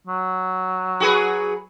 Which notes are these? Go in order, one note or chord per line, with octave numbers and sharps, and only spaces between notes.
F#3
F#4 G#4 B4